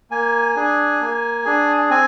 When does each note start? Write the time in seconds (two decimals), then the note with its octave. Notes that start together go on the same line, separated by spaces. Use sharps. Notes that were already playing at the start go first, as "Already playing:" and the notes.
0.10 A#3 G#5
0.56 D4 G#4
1.01 A#3
1.45 D4 G#4
1.90 C4 G#5